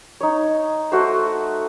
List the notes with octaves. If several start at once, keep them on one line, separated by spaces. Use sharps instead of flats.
D#4 C#5
A3 F#4 C5